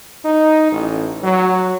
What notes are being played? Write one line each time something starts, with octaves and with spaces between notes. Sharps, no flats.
D#4
A1
F#3